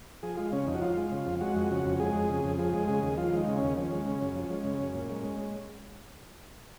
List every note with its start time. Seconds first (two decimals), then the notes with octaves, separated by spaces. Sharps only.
0.23 F3 G#4
0.37 G#3 F4
0.52 C#3 C#4
0.67 F2 D#4
0.75 F#4
0.82 F3 F4
0.97 G#3
1.11 C#3
1.26 F2
1.41 G#3 F#4
1.56 F2
1.71 C#3
1.85 F2
2.00 G#3 G#4
2.15 F2
2.29 C#3
2.45 F2
2.58 F3 G#4
2.73 G#3
2.88 C#3 G#4
3.03 D#2
3.17 F3 F4
3.33 G#3 D#4
3.48 C#3
3.58 D#2 C#4
3.76 F3 C#4
3.92 G#3
4.06 C#3
4.22 F#2
4.36 F3
4.50 G#3
4.65 C#3
4.80 F#2
4.94 A#2
5.09 G#3
5.24 G#3